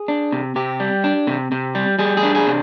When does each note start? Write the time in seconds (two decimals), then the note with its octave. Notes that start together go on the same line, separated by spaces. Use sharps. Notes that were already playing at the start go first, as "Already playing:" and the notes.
Already playing: G#4
0.08 D4
0.32 C3
0.56 C3 G4
0.80 G3
1.04 D4
1.27 C3
1.52 C3
1.75 G3
1.99 G3 G#4
2.17 G#4
2.23 D4
2.35 G#4
2.47 C3